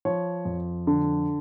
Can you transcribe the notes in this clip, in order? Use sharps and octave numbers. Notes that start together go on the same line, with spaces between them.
F3 C#5
F2
D3